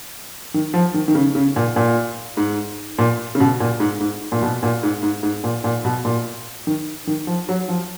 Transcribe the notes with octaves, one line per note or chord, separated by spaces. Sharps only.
D#3
F3
D#3
D#3
C#3
C#3
A#2
A#2
G#2
A#2
C#3
B2
A#2
G#2
G#2
A#2
B2
A#2
G#2
G#2
G#2
A#2
A#2
B2
A#2
D#3
D#3
F3
F#3
F3